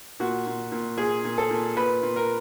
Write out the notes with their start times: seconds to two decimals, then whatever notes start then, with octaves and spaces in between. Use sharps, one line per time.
0.20 A#2 F#4
0.46 A#2
0.72 A#2
0.98 A#2 G#4
1.24 A#2
1.38 A4
1.50 A#2
1.76 A#2 B4
2.03 A#2
2.16 A#4